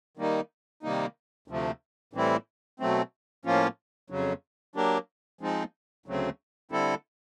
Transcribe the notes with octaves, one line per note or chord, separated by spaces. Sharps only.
D#3 G3 A#3 D#4
C3 D#3 G3 A#3 D#4
D2 C3 F3 A3
A2 E3 G3 C4 E4
B2 F#3 A3 C4
A2 F3 A#3 C#4 F4
F2 C#3 F#3
F#3 A#3 D4 G4 A#4
F3 G#3 C4 D#4
D2 C#3 F#3 A3 C4
D3 G3 C4 E4 A4